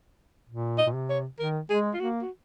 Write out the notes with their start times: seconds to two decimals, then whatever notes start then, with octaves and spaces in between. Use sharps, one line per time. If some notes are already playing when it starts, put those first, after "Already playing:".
0.49 A#2
0.78 D#5
0.86 A#2
0.94 C3
1.09 C#5
1.39 D#3 A#4
1.70 G#3 G#4
1.94 F4
2.00 A#3 F#4
2.22 F#4